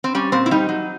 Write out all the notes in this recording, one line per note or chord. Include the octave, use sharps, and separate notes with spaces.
C4
G3 C#4
A#2 C4
E4
G3 D#4
F#3